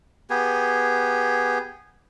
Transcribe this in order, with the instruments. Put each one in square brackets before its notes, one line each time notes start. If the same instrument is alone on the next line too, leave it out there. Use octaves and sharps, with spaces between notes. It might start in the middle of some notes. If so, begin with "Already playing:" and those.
[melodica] B3 G4 G#4